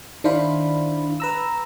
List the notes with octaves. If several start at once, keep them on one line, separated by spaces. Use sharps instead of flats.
D#3 D4 E4 C5 F5 B5
B4 A#5 E6